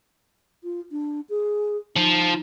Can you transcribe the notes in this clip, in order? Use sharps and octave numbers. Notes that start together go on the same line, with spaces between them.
F4
D4
G#4
F3 D#4